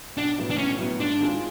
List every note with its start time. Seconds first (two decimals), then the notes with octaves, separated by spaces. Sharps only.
0.17 B1 D4
0.38 A2 F#3 B3
0.50 D4
0.58 B1 C#4
0.79 A2 F#3 B3
0.99 G#2 D4
1.20 D#3 G#3 C4 F4